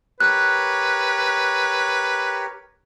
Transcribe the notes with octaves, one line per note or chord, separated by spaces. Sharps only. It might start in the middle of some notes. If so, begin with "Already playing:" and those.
G4 A#4 B4 C#5 F#6